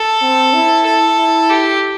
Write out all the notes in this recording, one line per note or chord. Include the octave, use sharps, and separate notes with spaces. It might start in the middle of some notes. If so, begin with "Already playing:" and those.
Already playing: A4
C4
E4
A4
E4
G4